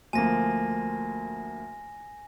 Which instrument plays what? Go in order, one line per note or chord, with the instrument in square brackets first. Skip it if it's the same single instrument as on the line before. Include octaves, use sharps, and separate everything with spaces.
[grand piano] D2 F3 A#3 [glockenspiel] G#5 A#6